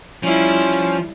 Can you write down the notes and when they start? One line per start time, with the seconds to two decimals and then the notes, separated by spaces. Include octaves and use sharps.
0.24 F3 G3 C#4 E4